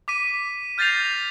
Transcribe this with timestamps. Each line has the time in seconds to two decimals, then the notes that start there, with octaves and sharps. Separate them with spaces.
0.08 D6 B6 D#7
0.78 F6 G6 A6 A#6 C7 F7